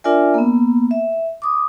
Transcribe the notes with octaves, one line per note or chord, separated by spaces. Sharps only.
D4 F4 A#4 D5 E5 G#5
A#3 B3
E5
D6 D#6